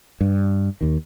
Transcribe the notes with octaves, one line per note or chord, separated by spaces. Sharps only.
G2
D#2 D#3